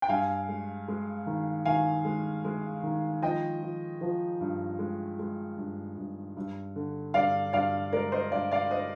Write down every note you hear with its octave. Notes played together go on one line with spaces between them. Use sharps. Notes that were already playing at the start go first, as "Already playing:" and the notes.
G5
G2 F5 G#5
G#3
G#3
D#3
D#3 F5 G#5
G#3
G#3
D#3
F3 D#5 G5
F3
F3
G2
G#3
G#3
G2
G2
G2
D3
G2 D5 F5
G2 D5 F5
G#3 A#4 D5
C5 D#5
G2 D5 F5
D5 F5
C5 D#5